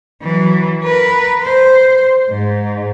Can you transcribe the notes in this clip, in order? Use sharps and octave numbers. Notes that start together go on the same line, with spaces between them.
E3 F#3
A#4 B4
C5
G#2